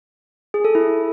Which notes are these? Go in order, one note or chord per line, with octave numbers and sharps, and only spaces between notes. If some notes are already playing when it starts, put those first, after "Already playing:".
G#4
A4
E4